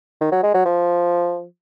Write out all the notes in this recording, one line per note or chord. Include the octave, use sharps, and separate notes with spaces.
D#3
F#3
G#3
F#3
F3